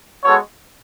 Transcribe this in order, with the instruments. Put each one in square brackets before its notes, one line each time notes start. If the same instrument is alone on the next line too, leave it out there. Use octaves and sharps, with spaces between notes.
[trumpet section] G#3 B3 F#4 A4 C#5